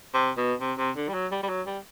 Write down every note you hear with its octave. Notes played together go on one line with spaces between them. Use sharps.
C3
B2
C3
C3
D3
G3
F#3
G3
G3
F#3
G3